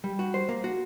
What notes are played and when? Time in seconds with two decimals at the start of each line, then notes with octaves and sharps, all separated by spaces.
0.04 G3
0.19 F#4
0.34 C5
0.49 A#3
0.64 F#4